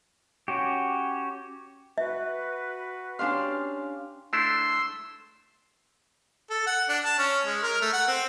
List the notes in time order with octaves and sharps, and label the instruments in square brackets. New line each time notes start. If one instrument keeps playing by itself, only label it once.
[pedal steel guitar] C#4 F#4 G4
[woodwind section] F#4 B4 [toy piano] E5
[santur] C#4 F5 [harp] D4 G4 C6
[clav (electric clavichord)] A3 D4 E4 [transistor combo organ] C6 E6
[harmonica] A4
F#5
D4
A5
C#4
G#3
A#4
A3
F#5
C4